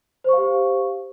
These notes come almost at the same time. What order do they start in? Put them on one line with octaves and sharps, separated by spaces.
C5 C#6 F5 G4